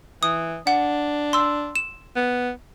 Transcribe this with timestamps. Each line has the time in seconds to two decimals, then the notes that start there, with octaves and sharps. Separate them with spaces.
0.23 E3 D#6
0.67 D4 F#5
1.33 C6 E6
1.76 E7
2.16 B3